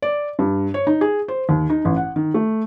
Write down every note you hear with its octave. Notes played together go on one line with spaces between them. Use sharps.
D5
G2
C#5
D#4
G#4
C5
D#2
D#4
A1
F#5
D#3
A3